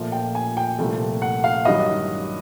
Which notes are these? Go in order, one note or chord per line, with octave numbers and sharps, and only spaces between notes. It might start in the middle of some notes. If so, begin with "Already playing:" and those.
Already playing: A#1 A#2 F3 A3
G5
G#5
G5
C2 A#2 F3 A3
F#5
F5
A1 G2 D#3 F#3 D#5